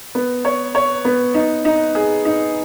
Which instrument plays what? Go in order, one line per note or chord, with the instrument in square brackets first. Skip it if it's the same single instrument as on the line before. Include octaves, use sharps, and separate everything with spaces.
[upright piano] B3
C#5
C#5
B3
D#4
D#4
G#4
D#4